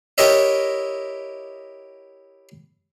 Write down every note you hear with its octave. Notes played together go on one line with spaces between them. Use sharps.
E4 G4 A#4 C#5 D#5 E5